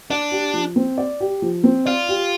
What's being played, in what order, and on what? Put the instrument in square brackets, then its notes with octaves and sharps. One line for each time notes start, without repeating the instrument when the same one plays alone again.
[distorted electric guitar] D4 [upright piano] D5
[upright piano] G4
F3
C4
D5
G4
F3
C4
[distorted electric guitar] F4 [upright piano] D5
[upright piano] G4